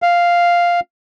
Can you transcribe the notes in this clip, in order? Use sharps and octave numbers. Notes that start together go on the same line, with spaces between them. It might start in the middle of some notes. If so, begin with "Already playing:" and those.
F5